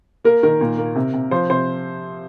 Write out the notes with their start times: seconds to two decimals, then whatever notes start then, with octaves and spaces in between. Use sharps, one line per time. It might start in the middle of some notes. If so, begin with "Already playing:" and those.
0.24 A#3 A#4
0.43 D#3 A#4
0.61 A#2
0.78 A#3
0.95 C3
1.13 C3
1.31 F3 C5
1.50 C3 C5